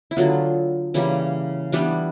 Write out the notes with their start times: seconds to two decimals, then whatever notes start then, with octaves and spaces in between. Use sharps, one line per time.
0.11 E4
0.16 D3 F#3 B3 F4
0.94 C#3 E3 G3 A#3 E4
1.72 E3 G3 B3 D4